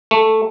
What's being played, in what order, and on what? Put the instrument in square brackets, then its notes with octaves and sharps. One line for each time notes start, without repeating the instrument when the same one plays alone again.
[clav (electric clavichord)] A3